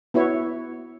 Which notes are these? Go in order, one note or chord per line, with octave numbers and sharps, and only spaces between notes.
B3 E4 F#4 C#5